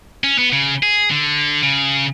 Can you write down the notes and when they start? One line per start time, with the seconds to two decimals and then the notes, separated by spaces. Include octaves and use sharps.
0.24 C#4
0.38 B3
0.52 C#3
0.83 G#4
1.11 D3
1.63 C#3